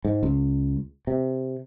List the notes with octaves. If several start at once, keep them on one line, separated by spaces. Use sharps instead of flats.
G#2
C#2
C3